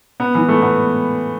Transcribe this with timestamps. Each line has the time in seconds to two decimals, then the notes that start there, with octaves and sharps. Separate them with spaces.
0.20 B3
0.35 E3
0.49 A3
0.62 B3